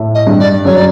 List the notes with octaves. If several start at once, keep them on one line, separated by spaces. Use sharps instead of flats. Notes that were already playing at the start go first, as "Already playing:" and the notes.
Already playing: A2 A3
D#5
G2 G3
D5
F#2 F#3 C#5
D5